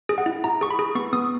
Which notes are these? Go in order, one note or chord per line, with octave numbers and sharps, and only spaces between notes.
G#4
F#5
E4
E4 A#5
G#4 C#6
B5
G#4
B3 C#6
B3 D#6